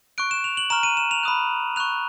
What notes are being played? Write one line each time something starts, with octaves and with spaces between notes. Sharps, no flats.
C#6 F#6 D7
E7
F7
F#7
A#5 C#6 F6 E7
D#7
E7
F7
B5 D#6 F#6
C#6 F#6 F7